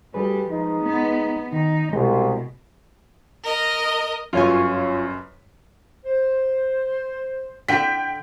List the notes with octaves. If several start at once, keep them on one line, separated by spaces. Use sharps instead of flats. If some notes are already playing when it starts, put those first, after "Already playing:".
D2 G3 G#4 B4
F3 G#3 D#4
B3
D#3 D#4
C2 B2 G#3
A#4 D#5
G1 F#2 F4 C#5 G#5
C5
D3 G5 B6